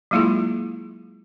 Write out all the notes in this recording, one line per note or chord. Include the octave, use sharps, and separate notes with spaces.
F#3 G#3 A#3 E4 F4 G#4